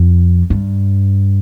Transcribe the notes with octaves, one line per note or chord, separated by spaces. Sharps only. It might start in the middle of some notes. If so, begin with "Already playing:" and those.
Already playing: F2
G2